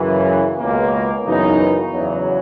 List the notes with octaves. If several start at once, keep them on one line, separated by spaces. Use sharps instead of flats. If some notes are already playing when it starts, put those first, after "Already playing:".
Already playing: F#2 C#3 E3
C#2 B2 A#3
F#2 C#3 E3 B3 D#4
E2 C#3 F#3